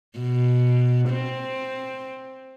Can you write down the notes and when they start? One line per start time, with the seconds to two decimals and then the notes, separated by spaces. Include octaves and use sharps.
0.19 B2
1.09 C4